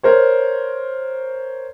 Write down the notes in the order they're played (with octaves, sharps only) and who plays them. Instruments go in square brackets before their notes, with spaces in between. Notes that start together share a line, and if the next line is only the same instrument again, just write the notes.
[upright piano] A#4 C5 C#5